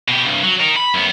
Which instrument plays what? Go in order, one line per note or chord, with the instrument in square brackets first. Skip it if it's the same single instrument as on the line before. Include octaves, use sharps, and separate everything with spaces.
[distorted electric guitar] B2 G4
C2 G2
F#3
D#4 A#4
B5
F#2 B3